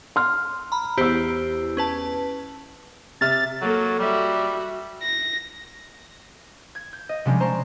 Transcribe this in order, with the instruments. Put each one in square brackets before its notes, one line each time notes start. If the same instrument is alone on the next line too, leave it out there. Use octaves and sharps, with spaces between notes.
[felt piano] C6 F6
[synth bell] A#5 B5
[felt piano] E2 E6 [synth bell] E4 G4 C5
[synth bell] C#4 B4 A5
[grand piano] C3 E5 F6 [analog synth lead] A6
[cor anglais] F#3 [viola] A#3 A4
[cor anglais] G3 [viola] F#4 E5
[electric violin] A#6
[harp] G#6
G6
D#5
C3 F3 G3 G#3 C#4 D4
C5 D5 A5 A#5 C#6